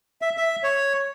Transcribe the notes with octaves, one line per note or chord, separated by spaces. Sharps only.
E5
E5
C#5